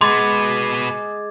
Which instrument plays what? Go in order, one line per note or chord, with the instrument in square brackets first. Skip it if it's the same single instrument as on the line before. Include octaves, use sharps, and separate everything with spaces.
[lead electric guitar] B2 B3 [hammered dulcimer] G#3 [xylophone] C6 [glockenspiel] D6 G#6 A6